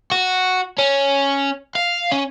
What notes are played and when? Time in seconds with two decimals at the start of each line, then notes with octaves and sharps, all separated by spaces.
0.11 F#4
0.79 C#4
1.75 F5
2.12 C#4